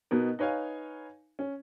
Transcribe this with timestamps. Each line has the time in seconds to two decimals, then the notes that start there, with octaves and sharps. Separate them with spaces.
0.11 B2 B3 D#4 A#4
0.39 D#4 B4 C#5 F5 G#5
1.39 C#4